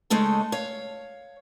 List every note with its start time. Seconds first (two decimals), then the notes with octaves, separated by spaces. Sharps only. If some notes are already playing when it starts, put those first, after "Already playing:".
0.10 C#3 G#3 A3 D#4 A4
0.52 C#5 F5